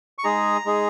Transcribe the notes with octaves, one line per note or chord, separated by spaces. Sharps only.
C#6
G#3 D#4 G#4 A#5
G#3 D#4 G#4